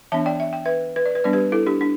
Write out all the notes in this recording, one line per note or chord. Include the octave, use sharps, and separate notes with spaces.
E3 B3 D4 E5 A5
D5 G5
E5
G5
B4 E5
B4
D5
B4
G3 B3 D4 D5
G4 B4
E4 A4
D4 G4
D4